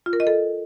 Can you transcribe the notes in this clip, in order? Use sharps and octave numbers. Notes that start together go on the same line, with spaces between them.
F4
A#4
D#5
A4